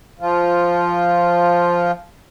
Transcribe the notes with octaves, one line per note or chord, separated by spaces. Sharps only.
F3 F4